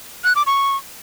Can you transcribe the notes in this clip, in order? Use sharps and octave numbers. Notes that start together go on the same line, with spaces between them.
F#6
D6
C#6